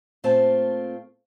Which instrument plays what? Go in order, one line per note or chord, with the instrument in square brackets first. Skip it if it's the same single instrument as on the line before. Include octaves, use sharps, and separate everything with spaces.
[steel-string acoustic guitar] A#2 A3 C4 F4 A5